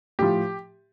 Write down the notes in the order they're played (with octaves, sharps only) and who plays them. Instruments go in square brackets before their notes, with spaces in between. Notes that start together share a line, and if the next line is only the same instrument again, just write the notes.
[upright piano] A2 F3 G4